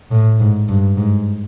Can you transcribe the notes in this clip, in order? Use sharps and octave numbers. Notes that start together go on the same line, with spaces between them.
A2
G#2
G2
G#2